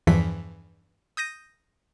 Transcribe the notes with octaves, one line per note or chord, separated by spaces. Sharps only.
E2 G2 E3 F3 B6
D#6 G6 A#6 D#7